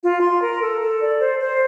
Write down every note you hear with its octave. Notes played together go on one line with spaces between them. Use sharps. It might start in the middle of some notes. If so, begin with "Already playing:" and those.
F4
C6
A#4
A4
A4
D5
C5
C5